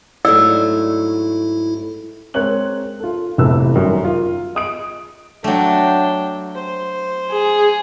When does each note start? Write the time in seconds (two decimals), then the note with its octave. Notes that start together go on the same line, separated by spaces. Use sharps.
0.25 G#2 F#3 A3 E4 D5 E6
2.34 G#3 C4 A#4 C#5 F#6 F#7
3.00 F4 A4
3.38 F1 C3 E3 B3 A4 E6
3.75 F#2 D#3 F#3 G3
4.05 F4
4.55 D#5 D#6 D7
5.44 F#3 A3 D4 G5
6.55 C5
7.32 G#4